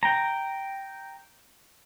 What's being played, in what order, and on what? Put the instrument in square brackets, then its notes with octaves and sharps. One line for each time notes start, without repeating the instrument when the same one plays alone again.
[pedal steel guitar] G5 A#5